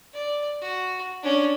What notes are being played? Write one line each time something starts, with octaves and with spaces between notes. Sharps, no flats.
D5
F#4
C#4 D4